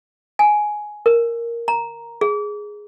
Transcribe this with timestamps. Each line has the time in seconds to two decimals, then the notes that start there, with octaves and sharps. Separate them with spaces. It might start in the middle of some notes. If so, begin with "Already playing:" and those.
0.39 G#5
1.06 A#4
1.68 A#5
2.21 G#4